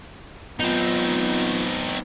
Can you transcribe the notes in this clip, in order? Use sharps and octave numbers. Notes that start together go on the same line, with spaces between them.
F#3 B3 C4 D#4 F4